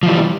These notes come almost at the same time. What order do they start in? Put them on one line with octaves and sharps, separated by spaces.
F3 E3 G3